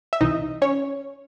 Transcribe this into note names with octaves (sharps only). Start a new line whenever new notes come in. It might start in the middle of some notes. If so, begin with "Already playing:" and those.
E5
C2 C3 E3 D#4 D#5
C#4 C#5